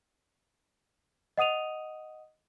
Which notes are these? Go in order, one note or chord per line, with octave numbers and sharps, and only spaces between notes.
D#5 F#5 D#6 D#7 F7